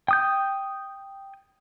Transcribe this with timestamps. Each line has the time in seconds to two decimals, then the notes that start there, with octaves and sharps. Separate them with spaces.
0.08 G5 D#6 G6